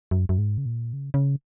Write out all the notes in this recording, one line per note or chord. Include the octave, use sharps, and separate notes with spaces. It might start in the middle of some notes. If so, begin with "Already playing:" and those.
F#2
F#2
G#2
C#3
A#2
C#3
C#3